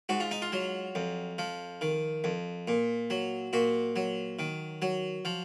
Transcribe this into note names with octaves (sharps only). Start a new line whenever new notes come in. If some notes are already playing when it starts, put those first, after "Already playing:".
G#2 F#4
F4
D#4
F4
F#3
F2
F3
D#3
F2
A#2
F#3
A#2 F#4
F#3
D#3
F#3
F3